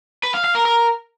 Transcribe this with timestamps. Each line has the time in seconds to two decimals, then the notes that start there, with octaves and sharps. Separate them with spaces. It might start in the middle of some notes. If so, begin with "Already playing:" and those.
0.23 B4
0.34 F5
0.44 F5
0.55 A#4
0.65 A#4